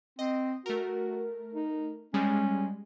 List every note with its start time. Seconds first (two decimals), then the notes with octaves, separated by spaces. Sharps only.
0.19 C4 D#5
0.66 A3 F#4 A#4
1.55 D#4
2.14 G3 G#3 C#4